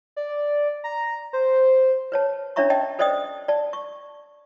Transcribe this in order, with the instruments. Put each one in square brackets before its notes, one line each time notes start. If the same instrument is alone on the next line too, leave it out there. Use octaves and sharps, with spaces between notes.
[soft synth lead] D5
A#5
C5
[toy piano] B4 C#5 A5
C#4 D4 C#5 E5 A#5 C#6
D#5 G5 A5
A4 C5 D5 D#5 G5 D#6
D5 A5
C#6